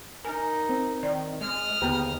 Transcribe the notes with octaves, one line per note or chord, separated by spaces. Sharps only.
D#4 A#4 G#5
C4
D#3 D5
G#3 D#6 F6
D#2 D3 B3 G4 G#4 G5 A#5